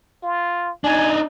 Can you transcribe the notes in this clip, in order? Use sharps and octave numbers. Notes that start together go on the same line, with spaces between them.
F4
D4 D#4 G#5